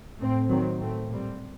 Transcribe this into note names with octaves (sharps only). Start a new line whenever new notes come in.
A2 A3 C4
D#3 F#3 C4
A2 A3 C4
A#2 G3 C4